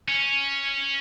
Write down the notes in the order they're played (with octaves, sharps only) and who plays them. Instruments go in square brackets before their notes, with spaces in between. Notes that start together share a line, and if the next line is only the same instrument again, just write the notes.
[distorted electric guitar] C#4